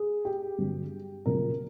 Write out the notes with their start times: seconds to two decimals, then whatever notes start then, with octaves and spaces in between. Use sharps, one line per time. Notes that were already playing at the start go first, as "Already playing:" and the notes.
Already playing: G#4
0.25 G4
0.58 G2 D3 F#3
1.26 F#2 C#3 F3 A#3 C#4 A#4